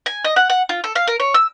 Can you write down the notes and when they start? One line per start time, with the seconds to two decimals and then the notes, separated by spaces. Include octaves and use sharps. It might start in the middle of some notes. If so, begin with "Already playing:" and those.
0.06 G#5
0.24 D#5
0.36 F#5
0.50 F#5
0.69 F4
0.84 A4
0.95 F5
1.07 A#4
1.20 C#5
1.34 E6